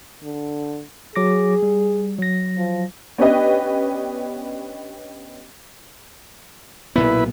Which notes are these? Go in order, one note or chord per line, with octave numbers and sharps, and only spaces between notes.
D3
F#3 G#4 D6 A#6
G3
F#3 A#6
F3
B3 C#4 D4 G4 B4 D#5
B1 A#2 B3 E4 B4